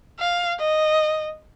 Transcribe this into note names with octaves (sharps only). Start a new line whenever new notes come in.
F5
D#5